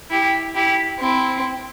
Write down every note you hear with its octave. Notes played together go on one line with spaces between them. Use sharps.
E4 G4
E4 G4
C4 E4